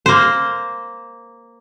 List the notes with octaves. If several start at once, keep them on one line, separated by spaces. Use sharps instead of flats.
A#3 C5